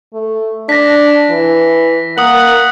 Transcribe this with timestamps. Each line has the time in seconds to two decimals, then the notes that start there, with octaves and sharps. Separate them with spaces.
0.13 A3
0.69 D4 A#6 B6
1.30 E3
2.18 A#3 F#5 D#6 F#7